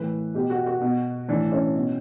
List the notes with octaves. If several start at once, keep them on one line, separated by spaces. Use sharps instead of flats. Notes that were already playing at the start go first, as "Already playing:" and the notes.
Already playing: A2 E3 B4
B2 G4
F#4
F#4
B2
A2 E3 D4
C#4
B2